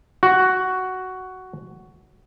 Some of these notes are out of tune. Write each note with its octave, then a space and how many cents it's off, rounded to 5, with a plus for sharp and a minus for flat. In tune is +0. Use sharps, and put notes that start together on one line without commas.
F#4 +10